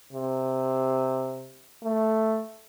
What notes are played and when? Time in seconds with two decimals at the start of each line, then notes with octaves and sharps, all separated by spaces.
0.13 C3
1.83 A3